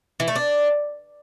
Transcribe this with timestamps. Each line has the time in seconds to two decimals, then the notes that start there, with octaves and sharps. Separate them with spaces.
0.20 E3
0.28 A3
0.36 D4